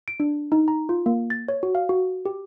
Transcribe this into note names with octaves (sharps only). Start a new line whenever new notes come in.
D7
D4
D#4
A#5
F4
A#3
A6
C#5
F#4
F5
F#4
G4